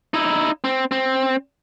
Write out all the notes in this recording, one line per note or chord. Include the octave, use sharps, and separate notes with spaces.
D#4 E4
C4
C4